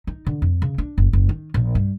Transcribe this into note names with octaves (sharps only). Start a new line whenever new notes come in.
D#4
D3
F2
C#3
D4
F#1
F#1
D#3
A#1
G2